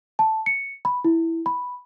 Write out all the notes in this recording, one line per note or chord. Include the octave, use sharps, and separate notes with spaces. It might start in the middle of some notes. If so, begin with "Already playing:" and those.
A5
C#7
B5
E4
B5